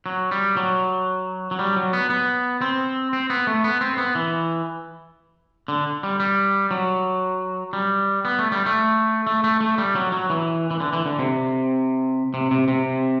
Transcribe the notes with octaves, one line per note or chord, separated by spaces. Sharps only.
F#3
G3
F#3
F#3
G3
F#3
B3
B3
C4
C4
B3
A3
B3
C4
B3
E3
D3
G3
G3
F#3
G3
B3
A3
G3
A3
A3
A3
A3
G3
F#3
F#3
E3
E3
D3
E3
D3
C3
C3
C3
C3